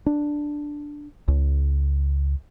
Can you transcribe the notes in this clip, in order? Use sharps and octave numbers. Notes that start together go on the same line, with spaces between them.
D4
C#2